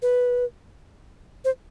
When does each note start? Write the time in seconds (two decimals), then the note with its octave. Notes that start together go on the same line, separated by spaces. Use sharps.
0.02 B4
1.45 C5